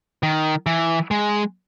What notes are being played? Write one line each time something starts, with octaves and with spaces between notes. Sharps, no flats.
D#3
E3
G#3